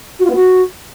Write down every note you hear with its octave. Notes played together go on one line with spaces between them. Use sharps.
F#4
F4
B3
F#4